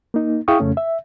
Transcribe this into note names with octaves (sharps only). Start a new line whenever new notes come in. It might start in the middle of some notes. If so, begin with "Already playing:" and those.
A#3 D#4
E4 G#4 F5 G5 C#6 D#6
F2 C#3 A3 C#4
E5